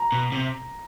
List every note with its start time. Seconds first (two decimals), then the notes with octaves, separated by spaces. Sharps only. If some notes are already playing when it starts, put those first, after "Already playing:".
Already playing: A#5
0.12 B2
0.32 C3